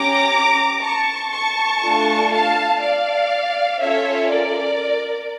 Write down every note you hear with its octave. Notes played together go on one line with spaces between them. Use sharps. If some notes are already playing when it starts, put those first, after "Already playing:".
Already playing: C#4 G4 A#5 D6
A5 C#6
A5 C#6
A3 D4 F4 A4
F5 A5
D5 F5
C#4 F4 A4 C#5 E5
A#4 D5